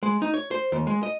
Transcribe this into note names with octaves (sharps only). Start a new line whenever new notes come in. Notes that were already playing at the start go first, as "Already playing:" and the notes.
G#3
D#4
C#5
C5
D#2
G#3
D#5